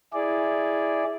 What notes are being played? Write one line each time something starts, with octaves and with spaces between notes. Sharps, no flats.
E4 G#4 D5